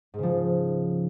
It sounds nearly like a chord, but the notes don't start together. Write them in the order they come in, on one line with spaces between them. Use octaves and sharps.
G#2 C#3 F3